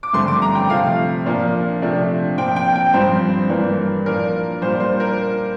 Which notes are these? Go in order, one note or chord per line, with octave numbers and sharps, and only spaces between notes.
D6
G2 D3 F3 A3 C4 C6
D6
A#5
G5
C3 F3 A3 F5
A#2 F3 A#3 D4
C3 F3 A3 D4
A#2 F3 C4 G5
G5
G5
G2 F3 C4 C5
G2 E3 A#3 D4
A#2 F3 A#3 D4 A#4
A#2 G3 D4 C5
C5
A#4